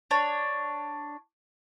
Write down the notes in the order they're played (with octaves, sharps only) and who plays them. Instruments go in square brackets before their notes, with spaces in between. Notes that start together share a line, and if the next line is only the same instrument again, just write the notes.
[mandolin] D4 C#5